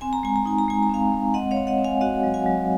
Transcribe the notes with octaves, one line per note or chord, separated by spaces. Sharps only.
C4 G#5
A#5
G#3 G#5
A#5
D#4 G#5
A#5
G#3 G#5
A#5
C4 F5 G#5
G#3
C4 D#5 F#5
C#5 F5
C4
D#5 F#5
C4
F5 G#5
F#4 D#5 F#5
F#3
F5 G#5
F#3